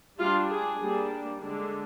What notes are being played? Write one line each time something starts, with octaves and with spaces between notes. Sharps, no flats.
G3 D4 F4
G#4
G3 A#3 D4
D3 G#3 D4